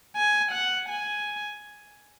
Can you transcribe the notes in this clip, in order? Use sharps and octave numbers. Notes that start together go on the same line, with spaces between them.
G#5
F#5
G#5